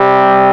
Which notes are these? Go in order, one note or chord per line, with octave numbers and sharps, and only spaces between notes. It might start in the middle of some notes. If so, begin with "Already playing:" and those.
Already playing: C3 G3